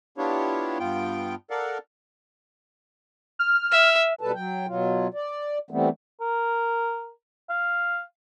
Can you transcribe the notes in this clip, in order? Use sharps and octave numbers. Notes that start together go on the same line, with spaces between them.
B3 D4 E4 F4 G4 C#5
G2 B3 F4 G5
A4 A#4 D5 F5 F#5
F6
E5
B2 G3 A4 B4 A5
F#3 G5
B2 F#3 F4
D5
E3 G3 A3 B3 C4
A#4
F5